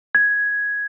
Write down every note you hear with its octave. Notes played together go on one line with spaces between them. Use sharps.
G#6